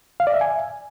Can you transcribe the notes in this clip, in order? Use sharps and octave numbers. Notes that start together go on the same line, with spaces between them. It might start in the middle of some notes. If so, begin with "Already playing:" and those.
F5
D5
E5
G#5